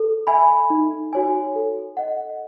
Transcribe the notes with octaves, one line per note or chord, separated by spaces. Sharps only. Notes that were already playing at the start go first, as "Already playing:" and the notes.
Already playing: A4
E5 G#5 B5
D#4
F#4 C#5 G#5
A4
D#5 F#5